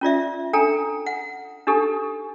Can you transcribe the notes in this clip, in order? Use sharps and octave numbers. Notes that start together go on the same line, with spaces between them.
C#4 F4 D5 E5
D4 A4 G5 A#5
F#5
D4 D#4 G4 A4